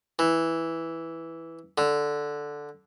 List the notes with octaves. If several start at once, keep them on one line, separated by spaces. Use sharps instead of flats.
E3
D3